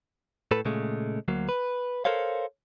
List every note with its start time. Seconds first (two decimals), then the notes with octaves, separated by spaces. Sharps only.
0.51 A2 A4 B4
0.65 A#2 C#3 G#3 A3
1.28 D2 F#3 A#3
1.49 B4
2.05 A4 A#4 C5 C#5 F5